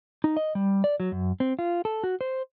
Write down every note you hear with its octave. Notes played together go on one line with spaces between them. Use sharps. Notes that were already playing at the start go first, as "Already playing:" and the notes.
D#4
D#5
G3
D5
F#3
F#2
C4
F4
A4
F#4
C5